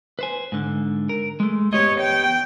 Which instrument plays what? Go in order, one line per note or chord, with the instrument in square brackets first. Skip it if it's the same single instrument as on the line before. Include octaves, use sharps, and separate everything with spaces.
[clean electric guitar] B4 C5 G#5
G#2 D3
A#4
G#3 A3
[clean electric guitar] B3 G4 D#5 [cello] C#5
[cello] G5